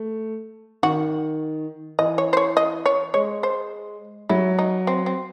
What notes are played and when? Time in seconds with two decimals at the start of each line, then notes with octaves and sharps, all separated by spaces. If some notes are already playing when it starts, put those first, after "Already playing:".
Already playing: A3
0.83 D#3 F#4
1.99 E3 D#5
2.18 C#5
2.33 C5
2.37 C#5
2.57 D#5
2.86 C#5
3.14 G#3 C#5
3.43 C5
4.29 F#3 E4
4.59 D#4
4.87 C4
5.06 C4